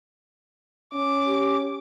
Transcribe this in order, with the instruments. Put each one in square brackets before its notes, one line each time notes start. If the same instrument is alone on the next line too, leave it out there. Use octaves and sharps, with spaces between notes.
[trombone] C#4 [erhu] D6
[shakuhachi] G4